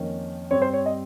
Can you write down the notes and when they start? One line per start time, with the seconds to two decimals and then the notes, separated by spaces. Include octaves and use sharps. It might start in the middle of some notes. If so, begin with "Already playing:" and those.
Already playing: F2 D#3 A#3 C#4
0.51 G2 G3 C4 C#5
0.62 C5
0.73 C#5
0.86 D#5